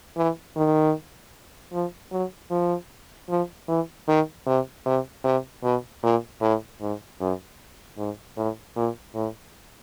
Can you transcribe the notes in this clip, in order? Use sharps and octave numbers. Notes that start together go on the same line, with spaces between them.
E3
D#3
F3
F#3
F3
F3
E3
D#3
C3
C3
C3
B2
A#2
A2
G#2
F#2
G#2
A2
A#2
A2